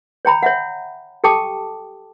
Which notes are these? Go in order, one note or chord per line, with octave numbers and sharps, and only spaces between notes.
C#5 G5 A#5 B5
C#5 E5 F#5
G4 A4 G5 A5 D6 D#6